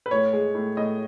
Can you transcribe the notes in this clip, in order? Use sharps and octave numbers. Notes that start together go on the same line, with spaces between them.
B4
A2 C#5
G#3
A2
A2 D#5